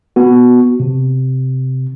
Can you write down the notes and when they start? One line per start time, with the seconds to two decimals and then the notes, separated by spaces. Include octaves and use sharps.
0.16 B3 F#4
0.80 C3